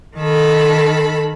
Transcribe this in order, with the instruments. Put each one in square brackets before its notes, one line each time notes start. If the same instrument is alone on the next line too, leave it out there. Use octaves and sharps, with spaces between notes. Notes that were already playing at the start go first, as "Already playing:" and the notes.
[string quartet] D#3 A4 B5